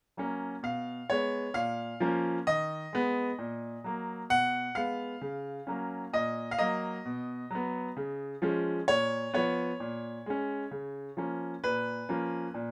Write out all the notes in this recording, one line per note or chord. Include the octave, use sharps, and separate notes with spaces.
F#3 A#3 C#4
B2 F5
G#3 B3 C#5
A#2 F5
F3 A#3 C#4
D#3 D#5
G#3 B3
A#2
F#3 A#3
B2 F#5
G#3 B3 F5
C#3
F#3 A#3 C#4
A#2 D#5
F5
F#3 A#3 D#5
B2
F#3 B3
C#3
F3 G#3 C#4
A#2 C#5
F3 B3 C#5
A#2
G#3 C#4
C#3
F3 A#3 C#4
A#2 B4
F3 A#3 C#4
A#2